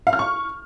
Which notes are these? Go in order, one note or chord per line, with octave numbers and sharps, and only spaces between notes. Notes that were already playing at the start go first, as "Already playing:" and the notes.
F5
F6
C#6